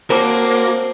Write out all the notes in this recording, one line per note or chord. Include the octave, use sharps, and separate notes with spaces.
A#3 C4 F#4 A#4 C5 A5 D6